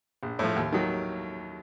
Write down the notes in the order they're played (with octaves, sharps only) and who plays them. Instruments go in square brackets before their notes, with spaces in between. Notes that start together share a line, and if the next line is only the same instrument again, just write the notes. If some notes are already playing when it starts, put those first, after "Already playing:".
[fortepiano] A#1
A2 F3
D#2
D#3 F#3